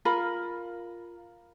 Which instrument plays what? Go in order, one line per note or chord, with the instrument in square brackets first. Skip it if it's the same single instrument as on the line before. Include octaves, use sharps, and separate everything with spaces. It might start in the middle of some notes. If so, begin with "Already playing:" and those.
[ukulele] F4 A#4 B5